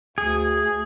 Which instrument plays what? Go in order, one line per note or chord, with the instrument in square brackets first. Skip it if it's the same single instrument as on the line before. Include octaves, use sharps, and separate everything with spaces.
[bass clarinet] D2 [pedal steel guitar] G#4